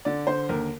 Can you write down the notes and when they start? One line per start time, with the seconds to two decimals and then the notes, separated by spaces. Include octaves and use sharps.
0.05 D3 D5
0.27 D3 C5
0.49 D#2 A#4